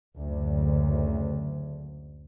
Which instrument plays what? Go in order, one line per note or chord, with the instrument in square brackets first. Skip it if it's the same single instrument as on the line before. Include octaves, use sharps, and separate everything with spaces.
[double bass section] F#1 D2